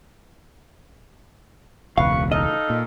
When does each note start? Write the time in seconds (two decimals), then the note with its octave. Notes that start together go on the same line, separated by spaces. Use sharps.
1.98 E1 C#2 B4 F5 C#6
2.32 D#4 A4 D#5 F5
2.70 A#2